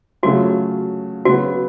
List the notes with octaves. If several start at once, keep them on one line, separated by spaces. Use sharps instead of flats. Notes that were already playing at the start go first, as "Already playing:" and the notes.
C#3 F#3 A3 F4 F#4
C#3 F#3 B3 F#4